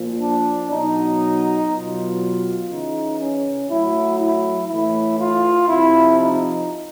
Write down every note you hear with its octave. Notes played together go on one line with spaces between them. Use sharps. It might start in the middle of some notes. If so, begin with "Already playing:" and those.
Already playing: A#2 F3
D4
B2 F#3 D#4
B2 F#3 F4
C#3 E3 D#4
C#4
A2 F#3 E4
E4
A2 E3 E4
F4
C3 F3 E4
D#4